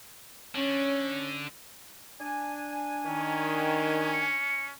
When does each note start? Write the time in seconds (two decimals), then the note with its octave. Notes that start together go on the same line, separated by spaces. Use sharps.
0.55 D3 C#4 C#5
2.20 D4 G#5
3.06 D#3 C#4
4.13 C#7